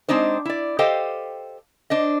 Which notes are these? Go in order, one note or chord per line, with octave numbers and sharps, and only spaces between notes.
G#3 C4 D4 D#4 C5
E4 D5
G4 A4 C5 D#5 F5 G5
D4 C5 D#5